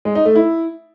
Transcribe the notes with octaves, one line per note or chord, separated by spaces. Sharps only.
G#3
D#4
A3
E4